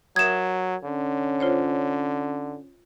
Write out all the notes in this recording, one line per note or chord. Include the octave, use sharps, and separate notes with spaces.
F#3 A#4 E5 D#6 G#6 E7
D3 C#4
F4 C5 C#5